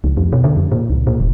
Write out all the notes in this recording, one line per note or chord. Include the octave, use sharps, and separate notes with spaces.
C#2
F2
B2
D3
F2
A#2
C#2
A#2
E1